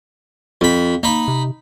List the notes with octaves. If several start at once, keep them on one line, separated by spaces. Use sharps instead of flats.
F2 F4 B5
A#3 D#4 B5
C3